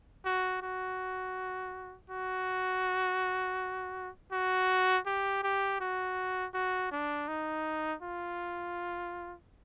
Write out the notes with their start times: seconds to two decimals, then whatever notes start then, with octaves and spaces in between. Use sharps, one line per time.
0.25 F#4
0.62 F#4
2.10 F#4
4.32 F#4
5.06 G4
5.43 G4
5.80 F#4
6.54 F#4
6.91 D4
7.28 D#4
8.02 F4